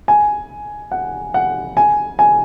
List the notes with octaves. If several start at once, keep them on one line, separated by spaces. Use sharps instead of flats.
G#5
F#5
F#5
G#5
G#5